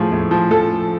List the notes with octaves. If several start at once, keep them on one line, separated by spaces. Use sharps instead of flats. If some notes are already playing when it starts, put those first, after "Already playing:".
Already playing: A2 F3 G#4
A2
F3
F3 A4